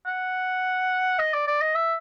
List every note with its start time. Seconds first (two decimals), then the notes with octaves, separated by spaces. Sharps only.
0.06 F#5
1.19 D#5
1.34 D5
1.47 D5
1.62 D#5
1.75 E5